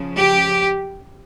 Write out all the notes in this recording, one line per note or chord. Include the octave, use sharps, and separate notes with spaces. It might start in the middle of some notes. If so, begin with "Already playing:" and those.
Already playing: C#3 F3
G4